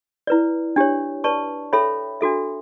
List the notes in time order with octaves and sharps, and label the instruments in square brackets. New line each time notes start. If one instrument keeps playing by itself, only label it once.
[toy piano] E4 B4 D5
D4 G4 C#5
B4 D5 A5 C#6
A4 C#5 E5 G5 B5
D4 F#4 A4 E5